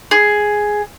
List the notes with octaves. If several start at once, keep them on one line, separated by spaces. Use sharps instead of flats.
G#4